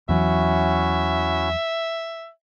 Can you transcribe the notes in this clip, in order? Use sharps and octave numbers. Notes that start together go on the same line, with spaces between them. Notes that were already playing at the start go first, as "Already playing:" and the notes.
E2 E3 F#3 C#4 E4 F#4 E5